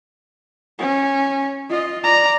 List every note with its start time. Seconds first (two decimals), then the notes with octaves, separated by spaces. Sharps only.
0.79 C#4
1.70 F4 D#5
2.04 D5 A#5